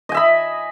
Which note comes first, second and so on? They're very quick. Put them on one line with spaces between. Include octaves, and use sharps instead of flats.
D#5 G#5 E5 B5